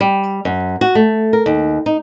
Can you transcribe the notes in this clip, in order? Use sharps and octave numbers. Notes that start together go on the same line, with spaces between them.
G3
F#2
F#4
A3
A#4
D#2
D#4